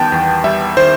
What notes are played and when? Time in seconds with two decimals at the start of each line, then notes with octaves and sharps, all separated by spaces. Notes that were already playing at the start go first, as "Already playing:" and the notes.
Already playing: E2 D#3 G3 B3 G5 A5
0.12 E2
0.44 G3 E5
0.77 D#3 C5